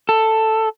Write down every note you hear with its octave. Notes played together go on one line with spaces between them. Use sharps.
A4